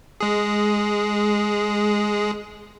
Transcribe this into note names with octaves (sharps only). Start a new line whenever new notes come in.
G#3 G#4